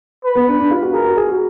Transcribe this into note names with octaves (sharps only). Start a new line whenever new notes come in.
B4
B3
D4
D4
F4
F#4
G#4 A#4
F#4
G#4
F#4